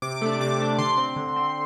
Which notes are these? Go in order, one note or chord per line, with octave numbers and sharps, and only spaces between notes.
C3 D6
A3 D4
C3 D6
A3 D4
D3 C6
C4
D3
C4